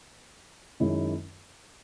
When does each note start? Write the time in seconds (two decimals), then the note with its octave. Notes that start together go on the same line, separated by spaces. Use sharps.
0.80 F#2 D#3 G#3 C#4 E4